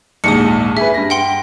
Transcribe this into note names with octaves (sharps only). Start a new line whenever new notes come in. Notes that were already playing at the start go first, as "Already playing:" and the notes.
A#1 D#2 G#2 D#6 C#7
G#4 B4 E5
G2 A#6
F#5 G5 C6